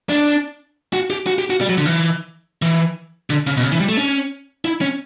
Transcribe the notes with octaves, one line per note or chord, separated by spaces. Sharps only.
D4
F#4
G4
F#4
G4
F#4
G3
F#3
D3
E3
E3
D3
C#3
B2
C#3
E3
G3
A3
C#4
E4
C#4